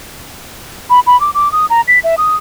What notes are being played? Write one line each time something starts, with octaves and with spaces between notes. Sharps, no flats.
B5
B5
D6
D6
D#6
A#5
B6
E5
D#6